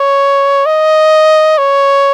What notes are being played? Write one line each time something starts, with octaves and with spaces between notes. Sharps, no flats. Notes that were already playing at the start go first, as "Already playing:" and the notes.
Already playing: C#5
D#5
C#5